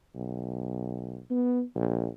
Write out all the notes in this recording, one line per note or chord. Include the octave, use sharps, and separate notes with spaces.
B1
B3
A#1